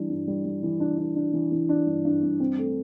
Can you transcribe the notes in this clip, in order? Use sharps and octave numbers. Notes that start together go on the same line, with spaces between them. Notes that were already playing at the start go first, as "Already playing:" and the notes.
Already playing: E3 G3 D4
G2
G3
G3
E3
D4
D4
D4
E3
E3
D4
G2
G2
G2
C4
A3